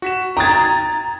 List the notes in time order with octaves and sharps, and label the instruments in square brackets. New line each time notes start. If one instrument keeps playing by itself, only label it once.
[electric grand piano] F#4 B6 E7
[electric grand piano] G5 D#6 G#6 [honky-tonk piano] A#5 A6